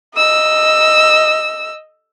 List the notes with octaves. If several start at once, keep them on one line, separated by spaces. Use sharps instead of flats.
D#5 E6